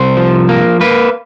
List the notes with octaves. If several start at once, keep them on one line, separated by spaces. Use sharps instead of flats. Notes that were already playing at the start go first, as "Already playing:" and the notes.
Already playing: C2 C5
F3
A#3
A#3 B4